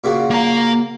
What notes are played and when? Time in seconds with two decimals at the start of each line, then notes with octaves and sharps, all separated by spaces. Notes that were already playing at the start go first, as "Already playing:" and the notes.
0.04 A#2 C#3 F#4
0.30 A#3 A#5